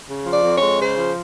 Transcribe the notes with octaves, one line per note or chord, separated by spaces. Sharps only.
C#3
F3
D5
F2
C#5
G#3
C#3 C5
F3